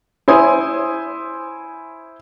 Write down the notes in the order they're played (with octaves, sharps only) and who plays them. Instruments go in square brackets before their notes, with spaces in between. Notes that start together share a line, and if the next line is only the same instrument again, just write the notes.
[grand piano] E4 C5 G#5 D#6